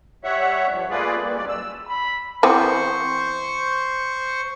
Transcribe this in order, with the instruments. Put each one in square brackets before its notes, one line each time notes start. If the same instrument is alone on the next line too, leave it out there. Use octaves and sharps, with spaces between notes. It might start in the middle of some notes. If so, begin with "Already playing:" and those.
[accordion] G3 C#5 E5 F#5
G2 F3
A3 A#3 F4 G#4 B4 D5
G3 A#3
F#2 F#3 G#3 D5
E6
[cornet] B5
[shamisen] E3 B3 C4 [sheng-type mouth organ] C5 C#6